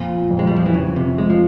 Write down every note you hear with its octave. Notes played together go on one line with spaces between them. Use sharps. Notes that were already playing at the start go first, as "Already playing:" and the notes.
Already playing: F2 A#2
F2
G#3
G3
F3
E3
F2 C#3
C3
F2 G#3
F3